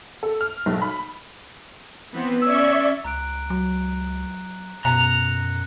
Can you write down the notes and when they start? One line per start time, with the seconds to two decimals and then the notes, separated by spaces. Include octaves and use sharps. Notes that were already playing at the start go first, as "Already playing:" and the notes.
0.23 A4
0.41 F6
0.66 B1
0.82 B5
2.12 E3 B3 C4
2.42 C#4 D5 E5 C#6 E6
3.04 C#2 A#5 F#6 D7
3.50 F#3
4.85 F#2 B2 A#5 F#6 C#7